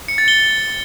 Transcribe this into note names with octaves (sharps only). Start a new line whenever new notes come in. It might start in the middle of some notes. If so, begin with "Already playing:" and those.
C#7
A6
G7